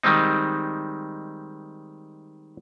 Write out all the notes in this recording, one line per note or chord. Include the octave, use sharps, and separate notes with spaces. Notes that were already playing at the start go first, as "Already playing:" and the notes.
D#3 G3 G#3 C4 D#4